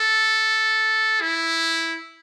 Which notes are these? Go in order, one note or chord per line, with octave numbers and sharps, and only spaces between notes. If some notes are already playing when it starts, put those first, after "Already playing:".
Already playing: A4
E4